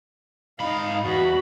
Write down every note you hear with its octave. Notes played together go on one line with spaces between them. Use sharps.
G#2 D#4 F5 B5
E2 F#4 B5